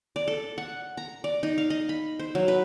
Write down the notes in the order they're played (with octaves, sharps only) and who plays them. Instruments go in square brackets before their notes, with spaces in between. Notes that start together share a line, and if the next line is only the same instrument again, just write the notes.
[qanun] D5
A4
F#5
A#5
D5
D#4
F5
D#5
B5
C5
F#3
B4